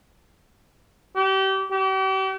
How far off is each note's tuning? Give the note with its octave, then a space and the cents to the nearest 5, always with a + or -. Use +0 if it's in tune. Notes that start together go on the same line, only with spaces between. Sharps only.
G4 -30
G4 -40